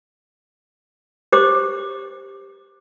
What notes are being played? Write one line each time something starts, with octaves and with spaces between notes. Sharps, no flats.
G4 C5 D6